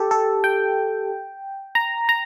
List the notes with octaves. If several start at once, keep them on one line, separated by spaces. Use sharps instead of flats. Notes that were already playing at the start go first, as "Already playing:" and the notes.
Already playing: G4 A4
A4
G5
A#5
A#5